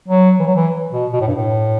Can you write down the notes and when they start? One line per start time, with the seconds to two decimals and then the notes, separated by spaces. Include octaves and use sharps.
0.08 F#3
0.39 E3
0.47 F#3
0.56 E3
0.92 B2
1.13 B2
1.21 A2
1.28 G2
1.35 A2